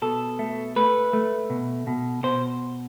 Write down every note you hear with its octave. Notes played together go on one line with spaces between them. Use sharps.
B2 A4
A3
A3 B4
A3
B2
B2
B2 C5